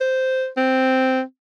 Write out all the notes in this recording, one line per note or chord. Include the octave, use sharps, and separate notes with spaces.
C5
C4